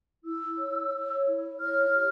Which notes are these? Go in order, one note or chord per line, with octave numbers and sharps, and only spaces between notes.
E4 E6
C#5
C#5
E4
C#5 F6
G4